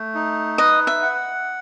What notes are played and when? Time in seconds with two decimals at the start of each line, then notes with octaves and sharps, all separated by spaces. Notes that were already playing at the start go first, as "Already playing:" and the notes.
Already playing: A3
0.15 D#4
0.58 B4 D#5
0.87 E5
1.02 F#5